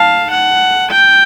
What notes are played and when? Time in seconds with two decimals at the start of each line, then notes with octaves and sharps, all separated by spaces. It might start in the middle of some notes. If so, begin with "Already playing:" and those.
Already playing: F5 A5
0.31 F#5
0.91 G5